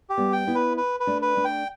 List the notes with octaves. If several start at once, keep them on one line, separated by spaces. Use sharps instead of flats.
G4
G3 B3
G5
B3 E4
B4
B4
B4
A3 D4
B4
A3 D4
G5